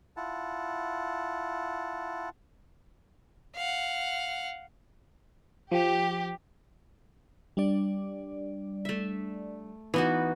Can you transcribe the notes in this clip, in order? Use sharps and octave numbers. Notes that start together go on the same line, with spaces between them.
E4 F4 F#5 A5
F5 F#5
F3 G4
G3 D4 D5
A3 E5
E3 B3 D#4 F#4